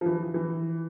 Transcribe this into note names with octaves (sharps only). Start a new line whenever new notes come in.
F3
E3
E3